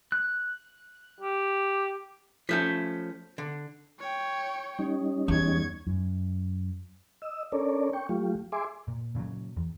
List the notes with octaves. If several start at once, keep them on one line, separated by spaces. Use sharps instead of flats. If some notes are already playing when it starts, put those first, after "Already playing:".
F#6
G4
F3 A3 C#4 G6 B6
D3
C#5 G5
G3 C#4 D#4
E2 C#6 G#6
F#2
D#5 E6
C#4 D4 A4 A#4 C#5 D5
G5 C#6
F#3 A3 F4 G4
G#4 E5 G#5 C6 D6
A#2
A#2 C#3 F3 F#3
E2